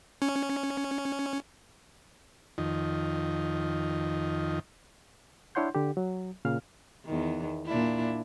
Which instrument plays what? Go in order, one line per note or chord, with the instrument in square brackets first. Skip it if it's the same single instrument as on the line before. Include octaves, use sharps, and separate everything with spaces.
[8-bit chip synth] C#4
[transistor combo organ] F2 D#3
[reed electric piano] D4 E4 C#5 F#5 C6 G6
D3 G4
F#3
A#2 C#3 F5 F6
[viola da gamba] E2 D#3
A#2 D4 E4